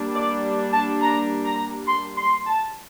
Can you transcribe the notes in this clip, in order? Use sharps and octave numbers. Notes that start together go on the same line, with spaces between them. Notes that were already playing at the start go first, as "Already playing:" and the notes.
Already playing: G3 A#3 D4
D5
A5
A#5
A#5
C6
C6
A5